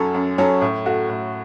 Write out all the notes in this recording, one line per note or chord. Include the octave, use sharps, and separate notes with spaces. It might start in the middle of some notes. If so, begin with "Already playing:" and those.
Already playing: F#2 F#3 C#4 A4
F#2
F#3 C#4 A4
A2
A3 F#4
A2